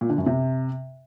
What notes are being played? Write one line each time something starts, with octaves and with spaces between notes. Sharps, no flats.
A#2
D3
F#2
C3